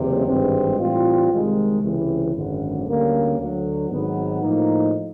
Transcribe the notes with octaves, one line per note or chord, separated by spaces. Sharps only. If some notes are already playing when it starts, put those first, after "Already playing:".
Already playing: F#1 E2 C3
G#1 G2 E3 G#3 C4
A2 E3 G3 C4 F4
C2 C3 D#3 G#3
C#2 C3 E3
G#1 F#2 D3
D2 D3 G3 A#3 C#4
D2 D3 F#3
G#1 G#2 D#3 F#3 B3
A2 F3 A#3 D#4